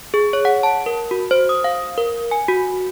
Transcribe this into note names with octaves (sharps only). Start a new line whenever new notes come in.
G#4
C#5
F#5
A5
A#4
F#4
C5
D#6
F5
A#4
G#5
F#4